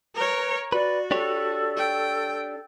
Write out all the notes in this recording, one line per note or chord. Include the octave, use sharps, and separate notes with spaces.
A#4 B4 C#5
F#4 B4 D5
D4 G4 A4 C#5
G5